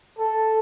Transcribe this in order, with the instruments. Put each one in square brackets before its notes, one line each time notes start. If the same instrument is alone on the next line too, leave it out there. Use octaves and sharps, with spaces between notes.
[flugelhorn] A4